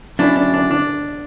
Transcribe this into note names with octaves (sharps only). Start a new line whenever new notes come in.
F#3 C#4 D4 E4
D4
D4
D4